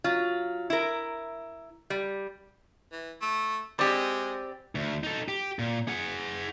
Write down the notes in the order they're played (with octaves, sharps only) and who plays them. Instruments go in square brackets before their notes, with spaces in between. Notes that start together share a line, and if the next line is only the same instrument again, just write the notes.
[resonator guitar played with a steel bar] F#3 F4
E4 A#4
G3
[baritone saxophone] E3
A3
[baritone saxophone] G#3 [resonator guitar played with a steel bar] C4 G4 [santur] D5
[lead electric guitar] D2
D#4 A4
G4
A#2
G#4 F#5